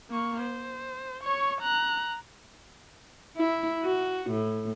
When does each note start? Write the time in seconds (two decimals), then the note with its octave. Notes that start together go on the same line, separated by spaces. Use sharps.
0.10 A#3 C#6
0.42 C5
1.24 C#5 C#6
1.61 A#5 F#6
3.37 E4
3.84 F#4
4.30 A2